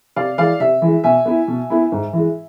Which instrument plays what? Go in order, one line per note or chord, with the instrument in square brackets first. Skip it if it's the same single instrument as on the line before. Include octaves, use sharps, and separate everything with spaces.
[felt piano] C3 [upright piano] D5 F5
[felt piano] E3 G#3 [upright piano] D5 F5
[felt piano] C3 [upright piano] E5
[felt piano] E3 G#3
[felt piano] B2 [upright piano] E5 G#5
[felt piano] B3 E4
B2
B3 E4
G#2
E3 G#3